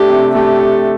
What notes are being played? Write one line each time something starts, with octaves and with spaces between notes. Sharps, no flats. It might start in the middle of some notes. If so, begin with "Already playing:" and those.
Already playing: A3 D4 G4 A4
C3
A3 G4
A4